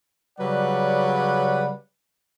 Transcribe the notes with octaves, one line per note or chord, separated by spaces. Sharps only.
C#3 F#3 G3 B4 D5 F#5